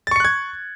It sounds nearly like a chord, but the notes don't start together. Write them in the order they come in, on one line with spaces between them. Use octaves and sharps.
A6 C#6 C#7 F#6 G#6